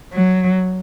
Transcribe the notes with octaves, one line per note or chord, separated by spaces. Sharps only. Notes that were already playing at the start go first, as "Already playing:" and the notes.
F#3